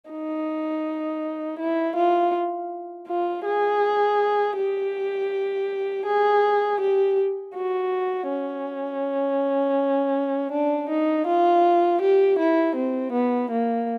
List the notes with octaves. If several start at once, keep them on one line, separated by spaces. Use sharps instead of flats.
D#4
E4
F4
F4
G#4
G4
G#4
G4
F#4
C#4
D4
D#4
F4
G4
E4
C4
B3
A#3